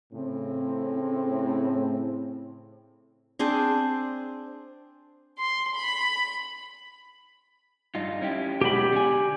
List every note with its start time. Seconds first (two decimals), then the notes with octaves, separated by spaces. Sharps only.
0.13 A2 C#3 C4
3.39 C4 D4 G#4 C5
5.38 C6
5.76 B5
7.95 G2 D#4 F4
8.21 C#4 E4 G4
8.61 B2 F#3 G#3 G4 B5
8.92 D3 G#5